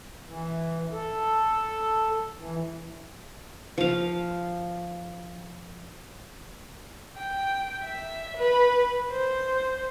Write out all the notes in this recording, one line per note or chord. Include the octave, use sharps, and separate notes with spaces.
E3
A4
E3
F3 F5
G5
E5
B4
C5